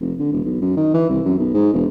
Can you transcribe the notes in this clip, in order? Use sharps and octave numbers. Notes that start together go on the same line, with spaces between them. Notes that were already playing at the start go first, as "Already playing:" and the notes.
F1
D3
E1
B1
F#2
D#3
E3
C2
F#2
B1
G#2
E1